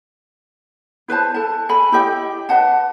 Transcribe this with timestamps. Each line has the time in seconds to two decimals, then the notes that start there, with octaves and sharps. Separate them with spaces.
1.08 E4 B4 C5 A5
1.34 A4 A5
1.69 A4 G#5 B5
1.92 E4 G4 D#5 G5
2.49 B4 D#5 F#5 A5